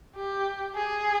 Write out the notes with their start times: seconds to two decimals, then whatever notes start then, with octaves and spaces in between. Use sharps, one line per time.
0.16 G4
0.75 G#4